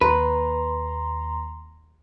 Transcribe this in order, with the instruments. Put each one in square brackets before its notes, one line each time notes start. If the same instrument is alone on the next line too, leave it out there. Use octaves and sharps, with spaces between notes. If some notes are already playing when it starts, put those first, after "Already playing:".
[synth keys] D#2 A#5 C6 [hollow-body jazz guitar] B4